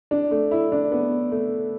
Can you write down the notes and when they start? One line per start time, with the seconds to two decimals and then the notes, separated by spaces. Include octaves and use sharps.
0.11 D4
0.31 A3
0.51 E4
0.72 D4
0.92 B3
1.31 A3